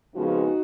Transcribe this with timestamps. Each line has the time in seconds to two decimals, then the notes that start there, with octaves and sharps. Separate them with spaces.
0.15 F2 C#3 F3 G#3 B3 D#4 F#4